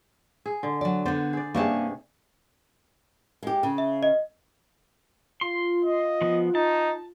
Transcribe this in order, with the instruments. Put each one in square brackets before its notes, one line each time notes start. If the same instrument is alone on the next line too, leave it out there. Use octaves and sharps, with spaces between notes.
[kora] G#4
D3
[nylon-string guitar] F#3 D5
[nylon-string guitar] D3 B3 [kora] C5 D5
[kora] G#4 D5
[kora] G2 C3 G#4 [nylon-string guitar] A#3 C#4 A5
[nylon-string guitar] G#3 G4
C#3
[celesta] E5
D#5
[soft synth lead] F4 [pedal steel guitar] C6
[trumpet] D#5
[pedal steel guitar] F3 B3
[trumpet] D#4 [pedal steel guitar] A5